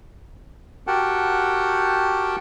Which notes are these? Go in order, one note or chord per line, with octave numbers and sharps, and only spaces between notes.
F#4 G4 A#4 F#5 G5 A5